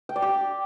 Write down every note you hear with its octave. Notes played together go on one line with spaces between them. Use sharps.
G5
D5
G4